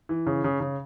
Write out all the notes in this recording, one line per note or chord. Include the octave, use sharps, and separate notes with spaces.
E3
C#3
C#3
C#3